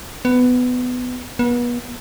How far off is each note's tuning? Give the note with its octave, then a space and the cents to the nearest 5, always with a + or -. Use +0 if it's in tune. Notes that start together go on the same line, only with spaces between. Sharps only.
B3 +15
B3 -35